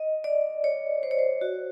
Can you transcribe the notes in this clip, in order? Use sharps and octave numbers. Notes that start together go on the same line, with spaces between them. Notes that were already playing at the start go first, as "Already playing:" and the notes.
Already playing: D#5
D5
C#5
C5
C#5
C5
F#4